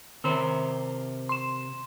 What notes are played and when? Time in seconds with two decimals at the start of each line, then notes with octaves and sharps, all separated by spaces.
0.24 C3 D#3 A#4 C5
1.29 C6 E7